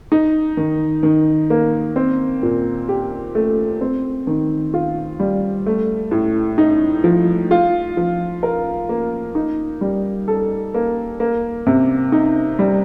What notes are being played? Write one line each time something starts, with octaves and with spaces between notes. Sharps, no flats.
D#4
D#3
D#3
A#3
C4
A#2
G4
A3
C4
D#3
F4
G3
A3
A2
D#4
F3
F4
F3
A#4
A#3
D#4
G3
A4
A#3
A#3
C3
D#4
G3